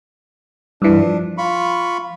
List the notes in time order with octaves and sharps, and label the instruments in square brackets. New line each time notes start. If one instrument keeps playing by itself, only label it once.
[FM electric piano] G2 E3 [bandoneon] D4
[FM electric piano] F3
[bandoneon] F4 B5 C#6